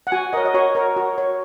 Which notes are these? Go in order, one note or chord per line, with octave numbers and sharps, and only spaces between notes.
F#5
F#4 G#5
A#4 C#5 D#5
D#5
F#4 C#5
A#4 C#5
F#4
C#5